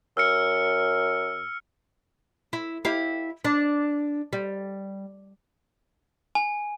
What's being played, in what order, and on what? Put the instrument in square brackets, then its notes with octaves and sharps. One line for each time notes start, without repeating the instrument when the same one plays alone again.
[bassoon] F#2 [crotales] E6 F6 C#7
[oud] E4
E4 G4 F5
D4
G3
[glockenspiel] G#5